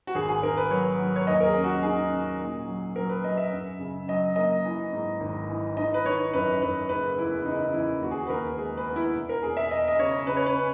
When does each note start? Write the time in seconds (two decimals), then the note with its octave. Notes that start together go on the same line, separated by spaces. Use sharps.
0.07 F#4
0.15 G#1 G#4
0.29 G#4
0.42 G#1 A#4
0.57 B4
0.70 F#3 C#5
0.99 F#3
1.16 C#5
1.27 D#2 D#5
1.40 A#4
1.46 G#4
1.55 C#4
1.64 F#4
1.83 D#3 G#4
2.12 C#4
2.40 A#2
2.68 F#3
2.96 F#3 A#4
3.09 B4
3.24 F#3 D#5
3.37 E5
3.52 F#2
3.80 C#3
4.08 F#3 D#5
4.36 A#3 D#5
4.65 E3
4.93 G#2
5.20 G#1
5.49 E3
5.77 D#3 D#5
5.94 B4
6.05 D#3 C#5
6.33 F#2 B4
6.62 F#2 B4
6.89 F#1 B4
7.18 E2 E4
7.45 C#3 D#4
7.74 E2 E4
8.02 D#2 F#4
8.11 G#4
8.20 F#4
8.27 B4
8.30 D#2 A#4
8.58 G#3 G#4
8.77 B4
8.86 B3
8.96 E4
9.14 E1
9.29 A#4
9.42 E1 G#4
9.57 E5
9.71 E1 D#5
9.88 D#5
9.99 C#3 C#5
10.27 C#3 B4
10.37 C#5
10.46 B4
10.56 C#4